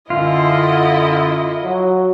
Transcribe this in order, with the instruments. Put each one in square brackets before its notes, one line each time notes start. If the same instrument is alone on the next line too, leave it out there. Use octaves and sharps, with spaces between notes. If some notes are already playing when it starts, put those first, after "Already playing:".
[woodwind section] F#2 D3 [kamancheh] E4 D#5 [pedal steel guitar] F4
[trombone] F#3